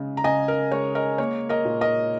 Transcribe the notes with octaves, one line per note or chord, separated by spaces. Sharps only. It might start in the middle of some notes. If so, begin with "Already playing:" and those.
Already playing: C#3 G#3
A#5
C#3 D#5 G#5
A#4
G#3 C#5
A#4 D#5
A#3 C#5
A#4 D#5
A#2
A#4 D#5